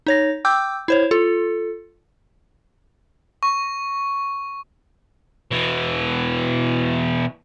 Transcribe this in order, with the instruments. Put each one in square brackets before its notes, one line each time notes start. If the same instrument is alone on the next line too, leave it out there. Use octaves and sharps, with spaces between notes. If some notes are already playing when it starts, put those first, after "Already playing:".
[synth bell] D#4 C#5 A#6
G5 D6 E6 G6
E4 C5 C#5
F4 A4
[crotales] C#6
[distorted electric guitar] B2 E3